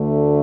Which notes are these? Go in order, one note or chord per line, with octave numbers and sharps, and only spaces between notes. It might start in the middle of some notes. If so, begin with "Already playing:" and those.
Already playing: D2 D3 A3